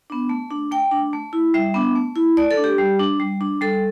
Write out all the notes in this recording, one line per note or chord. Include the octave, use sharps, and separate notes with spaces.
B3 D4
A3
D4
A3 G5
D4
A3
E4
G3 E5
B3 D4
A3
E4
A3 D5
A4
D4
G4
G3
D4
G3
D4
G3 A4